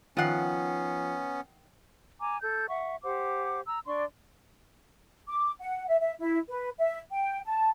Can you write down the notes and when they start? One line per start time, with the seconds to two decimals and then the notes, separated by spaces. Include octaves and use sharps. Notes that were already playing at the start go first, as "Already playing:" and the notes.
0.17 D#3 F3 B3 C#4 F#5 C7
2.20 G#5 A#5 D6
2.42 A4 G6
2.69 E5 F#5 C#6
3.03 G4 C5 F#5 D6
3.67 A#5 E6
3.86 D4 D5 C6 C#6
5.28 D6
5.61 F#5
5.88 E5
6.00 E5
6.19 E4
6.49 B4
6.79 E5
7.11 G5
7.46 A5